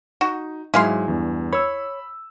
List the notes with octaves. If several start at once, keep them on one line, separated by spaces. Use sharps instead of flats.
D#4 F#4
G#2 F#3 G#3 E4 G#4 F5 C6
E2 G2
C#5 B5 E6